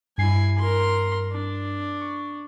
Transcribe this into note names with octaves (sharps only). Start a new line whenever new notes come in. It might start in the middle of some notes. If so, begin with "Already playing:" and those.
G2 E4 G#5 C7
A#4 C6
D4
C#6